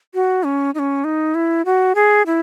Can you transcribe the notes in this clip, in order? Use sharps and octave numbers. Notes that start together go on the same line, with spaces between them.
F#4
C#4
D#4
C#4
D#4
E4
F#4
G#4
E4